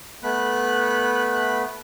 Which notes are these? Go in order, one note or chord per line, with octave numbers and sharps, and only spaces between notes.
A3 B3 B5 F#6